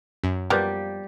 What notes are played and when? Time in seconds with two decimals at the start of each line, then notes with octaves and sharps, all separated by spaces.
0.24 F#2
0.50 F3 G3 A#3 B3 G4